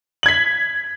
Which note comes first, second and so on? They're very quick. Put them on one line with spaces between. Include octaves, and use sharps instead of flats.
F#7 G#6 B6